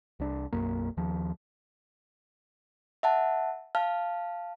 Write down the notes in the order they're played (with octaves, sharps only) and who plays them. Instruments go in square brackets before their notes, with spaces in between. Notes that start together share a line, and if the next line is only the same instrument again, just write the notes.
[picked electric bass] C2 D4
B1 F#2 A#3
D#2 D#3 F3
[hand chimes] E5 F#5 A5
F5 A5 F6